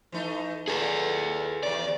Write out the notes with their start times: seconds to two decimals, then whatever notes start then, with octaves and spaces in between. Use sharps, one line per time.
0.12 E3 A3 D#4
0.68 A#2 A3 G#4 A4 B4
1.63 D#2 C3 D5